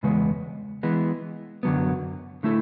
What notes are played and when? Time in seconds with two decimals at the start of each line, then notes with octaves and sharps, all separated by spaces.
0.03 E2 C#3 G#3 B3
0.83 E3 G#3 B3
1.63 F#2 D3 F#3 B3
2.43 D3 A3 E4 A4